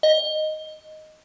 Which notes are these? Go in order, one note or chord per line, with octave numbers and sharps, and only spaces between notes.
D#5